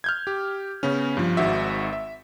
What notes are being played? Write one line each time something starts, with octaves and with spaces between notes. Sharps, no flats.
F6 G6 G#6
G4
C#3 B3 C#4
G2 F3
G#1 G#2 F#4 E5
E5